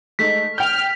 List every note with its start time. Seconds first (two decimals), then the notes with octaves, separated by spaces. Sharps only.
0.19 G#3 A3 D#4 B6
0.58 G5 F6 G6